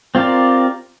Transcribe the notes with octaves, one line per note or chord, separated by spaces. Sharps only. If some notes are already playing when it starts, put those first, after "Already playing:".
C4 F4 G4 A#4 D5